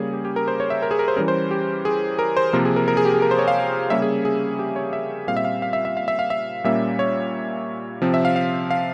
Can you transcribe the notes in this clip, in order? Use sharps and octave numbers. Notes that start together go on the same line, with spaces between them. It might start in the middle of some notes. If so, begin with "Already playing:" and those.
Already playing: C#3 G3 A#3 C#4 G#4
G4
G4
A#4
C5
C#5
E5
A#4
G#4
A#4
C5
E3 G3 C#4 A#4
C5
G4
G#4
A#4
C5
C3 F3 A#3 A#4
G#4
A#4
A#4
G#4
G4
G#4
A#4
C5
C#5
F5
C#3 G3 A#3 C#4 E5
G#4
G#4
G4
C#5
E5
A#2 G3 C4 F5
E5
F5
F5
E5
E5
F5
E5
F5
E5
A#2 G3 A#3 C#4 E5
C#5
C3 F3 C4
E5
F5
F5
F5